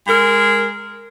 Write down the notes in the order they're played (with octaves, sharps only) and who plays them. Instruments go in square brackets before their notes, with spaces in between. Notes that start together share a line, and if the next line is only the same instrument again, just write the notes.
[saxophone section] G#3 A#4